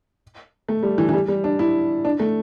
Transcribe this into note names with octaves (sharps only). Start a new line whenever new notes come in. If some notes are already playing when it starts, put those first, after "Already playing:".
A3
G3
E3
E3
G3
G3
D4
E4
D4
A3